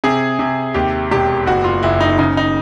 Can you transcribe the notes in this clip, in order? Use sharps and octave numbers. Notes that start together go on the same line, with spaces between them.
C3 G#4
C3
D#2 G4
E1 G4
F#1 F#4
F4
F#1 E4
D#4
C#3 D#4
D#4